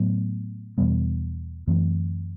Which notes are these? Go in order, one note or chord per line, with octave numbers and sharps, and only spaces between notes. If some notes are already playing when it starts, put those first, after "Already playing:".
Already playing: A2 F#3 B3
E2 B2 G3 B3
F#2 E3 A3 C4